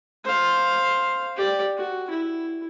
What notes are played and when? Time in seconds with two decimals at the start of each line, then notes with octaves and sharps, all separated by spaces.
0.24 C5 F5
1.36 G4 D5
1.78 F#4
2.10 E4